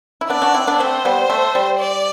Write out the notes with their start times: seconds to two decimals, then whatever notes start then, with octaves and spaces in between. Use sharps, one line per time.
0.21 E4
0.30 B3 D4 D5
0.42 D4 F#4
0.54 C4 E4
0.67 B3 D4
0.79 A3 C4 C5
1.05 G3 B3
1.30 A3
1.55 G3
1.80 D5